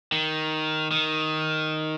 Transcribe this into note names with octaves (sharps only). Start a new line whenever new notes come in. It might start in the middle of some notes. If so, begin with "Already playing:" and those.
D#3
D#3